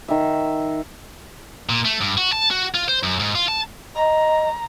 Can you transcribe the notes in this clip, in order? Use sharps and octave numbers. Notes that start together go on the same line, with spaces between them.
D#3 E5
A#2
A3
G2
F#4
A5
F#4
F4
C5
F#2
G#2
F4
A5
D#5 A#5